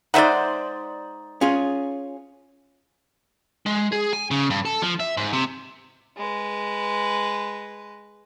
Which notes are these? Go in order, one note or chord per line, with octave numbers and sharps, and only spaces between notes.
G#3 D#4 C5 D5 E5 F#5
C#4 F4 G#4
G#3
G#4
G#5
C#3
G2
A4
F3
E5
G#2
C3
G#3 B4